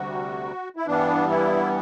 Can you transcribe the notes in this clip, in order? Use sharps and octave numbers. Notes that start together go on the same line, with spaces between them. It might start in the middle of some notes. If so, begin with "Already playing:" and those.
Already playing: D2 C3 G3 F#4
E4
G2 E3 G3 B3 D4
E4